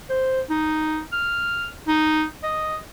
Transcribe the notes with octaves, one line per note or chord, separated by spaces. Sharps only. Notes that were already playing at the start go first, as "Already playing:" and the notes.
C5
D#4
F6
D#4
D#5